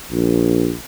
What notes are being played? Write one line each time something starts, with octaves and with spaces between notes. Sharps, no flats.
A#1